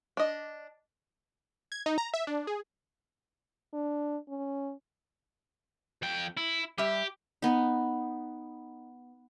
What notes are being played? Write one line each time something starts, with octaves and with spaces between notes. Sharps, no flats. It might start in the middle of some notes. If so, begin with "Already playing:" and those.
D4 D#5
G#6
D#4
A#5
E5
D4
G#4
D4
C#4
F2 G5
E4
G3 G4 E5
B3 D#4